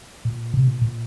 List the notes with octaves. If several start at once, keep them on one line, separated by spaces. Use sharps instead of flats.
A#2
C3
A#2
A#2